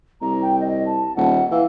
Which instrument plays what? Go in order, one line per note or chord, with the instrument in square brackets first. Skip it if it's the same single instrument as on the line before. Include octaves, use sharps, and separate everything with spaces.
[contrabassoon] C2 [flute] A#5
[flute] G5
D#5
A5
[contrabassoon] D#1 [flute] F#5
[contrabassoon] E3 [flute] F5